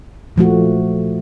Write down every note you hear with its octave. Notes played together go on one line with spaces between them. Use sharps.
A#2 F3 A3 F#4